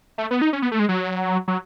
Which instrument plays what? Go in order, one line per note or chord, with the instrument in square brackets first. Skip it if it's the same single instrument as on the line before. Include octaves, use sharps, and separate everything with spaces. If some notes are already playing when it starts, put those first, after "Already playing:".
[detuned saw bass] A3
B3
D#4
C#4
B3
A3
G#3
F#3
F#3